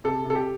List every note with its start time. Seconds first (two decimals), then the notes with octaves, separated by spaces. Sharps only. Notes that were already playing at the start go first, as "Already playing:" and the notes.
0.04 C3 A4
0.25 C3 A4
0.35 G4